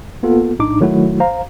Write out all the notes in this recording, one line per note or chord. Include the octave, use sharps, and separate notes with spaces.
A#3 B3 F4 A4
A#1 A2 D4 D#4 D6
D#3 F#3 A3 E4 F#4
C5 F5 A#5